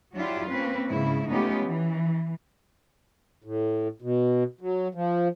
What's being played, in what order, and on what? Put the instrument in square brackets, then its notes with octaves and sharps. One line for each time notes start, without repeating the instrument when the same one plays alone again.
[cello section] F#3 D4 E4 F4 G4
A#3 C4 C#4 B4
G#2 C#3 E4
A3 B3 C#4 D#4 F4 G4
E3
[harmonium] A2
B2
F#3
F3